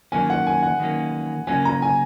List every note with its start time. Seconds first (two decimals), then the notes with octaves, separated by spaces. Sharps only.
0.12 D#3 F#3 A#3 C#4 G#5
0.30 F#5
0.47 G#5
0.63 F#5
0.80 D#3 F#3 A#3 C#4
1.47 C#3 F#3 A#3 C#4 G#5
1.65 A#5
1.82 G#5